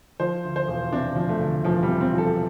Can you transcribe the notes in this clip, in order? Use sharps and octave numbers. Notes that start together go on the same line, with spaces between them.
F3 C5
D2
C5
E1
C3 D4
F3
A3
D2
E1 F3
G3
C3
C4
F3 A4